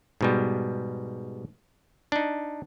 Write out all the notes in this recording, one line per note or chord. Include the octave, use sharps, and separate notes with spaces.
G#2 B2 G3
D4 D#4